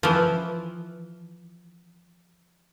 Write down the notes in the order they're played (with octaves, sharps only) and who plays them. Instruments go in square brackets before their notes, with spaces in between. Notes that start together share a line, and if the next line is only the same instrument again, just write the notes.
[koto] E3 F3